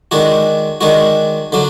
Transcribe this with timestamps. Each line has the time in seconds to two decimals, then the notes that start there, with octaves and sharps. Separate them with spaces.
0.11 D#3 G#3 D4 F#4
0.81 D#3 G#3 D4 F#4
1.52 D3 F#3 D4